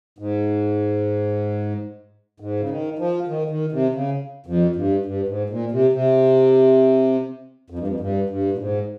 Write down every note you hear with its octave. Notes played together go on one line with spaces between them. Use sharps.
G#2
G#2
C#3
D#3
F3
D#3
D#3
C3
C#3
F2
G2
G2
G#2
A#2
C3
C3
F2
G2
F2
G2
G2
A#2
G#2